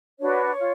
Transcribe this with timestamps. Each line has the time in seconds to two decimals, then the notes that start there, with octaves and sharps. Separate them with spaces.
0.19 D4 F#4 B4 C#5
0.59 F4